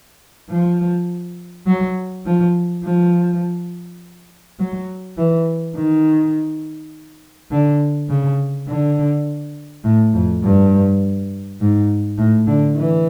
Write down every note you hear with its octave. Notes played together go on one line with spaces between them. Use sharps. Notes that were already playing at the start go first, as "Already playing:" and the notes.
F3
F#3
F3
F3
F#3
E3
D#3
D3
C#3
D3
A2
F2
G2
G#2
A2
D3
E3